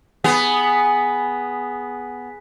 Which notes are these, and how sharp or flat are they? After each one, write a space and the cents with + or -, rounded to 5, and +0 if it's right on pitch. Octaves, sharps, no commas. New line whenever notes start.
B3 +0 G#4 +0